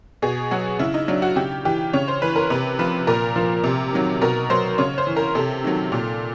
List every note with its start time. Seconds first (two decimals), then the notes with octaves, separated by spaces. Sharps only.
0.22 B2 G#4
0.51 F#3 F#4
0.79 C#3 E4
0.94 D#4
1.08 F#3 D4
1.22 F#4
1.36 C#3 G4
1.65 E3 G4
1.93 C#3 C#5
2.08 C5
2.22 E3 B4
2.36 A#4
2.50 C3 B4
2.79 F3 B4
3.07 A#2 A#4
3.36 F3
3.64 C3
3.93 D#3 F#3
4.21 B2 A#4
4.50 F#3 C5
4.78 C#3 C#5
4.98 C5
5.07 E3
5.17 A#4
5.35 C3 A4
5.64 D#3 F#3
5.92 A#2